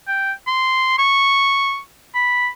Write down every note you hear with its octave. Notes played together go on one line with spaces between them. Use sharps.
G5
C6
C#6
B5